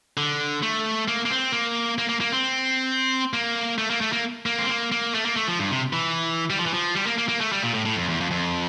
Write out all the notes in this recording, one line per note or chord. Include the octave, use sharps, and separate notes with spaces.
D3
A3
A#3
A#3
C4
A#3
A#3
A#3
A#3
C4
A#3
A3
A#3
A3
A#3
A#3
C4
A#3
A#3
A3
A#3
A3
F3
G2
C3
E3
G3
F3
E3
F3
G3
A#3
A#3
A#3
A3
G3
A#2
A2
A2
F2
E2
F2
F2